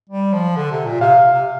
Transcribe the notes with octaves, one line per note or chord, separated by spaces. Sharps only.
G3
F3
D3
C3
A#2
C3 F5
C3